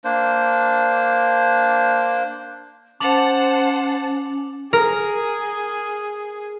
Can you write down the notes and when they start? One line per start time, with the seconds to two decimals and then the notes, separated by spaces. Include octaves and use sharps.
0.05 A#3 D4 C5
3.00 C#4 C5 F#5 A5 D6 F7 F#7
4.73 G#4 A#4